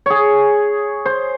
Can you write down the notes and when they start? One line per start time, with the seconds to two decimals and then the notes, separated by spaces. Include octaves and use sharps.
0.06 G#4 C#5
1.06 C5